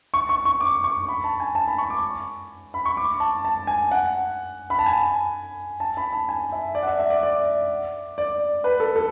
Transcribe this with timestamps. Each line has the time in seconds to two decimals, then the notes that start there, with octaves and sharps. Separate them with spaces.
0.14 C#6
0.29 C#6
0.45 C#6
0.61 D6
0.84 C#6
1.08 B5
1.24 A5
1.40 G#5
1.55 A5
1.68 B5
1.78 C#6
1.90 D6
2.74 B5
2.85 C#6
2.97 D6
3.20 A5
3.45 A5
3.67 G#5
3.91 F#5
4.70 B5
4.79 A5
4.86 G#5
5.80 A5
5.97 B5
6.13 A5
6.29 G#5
6.52 E5
6.75 D5
6.83 F#5
6.88 E5
7.00 E5
7.10 D5
7.23 D5
8.18 D5
8.64 B4
8.80 A4
8.96 A4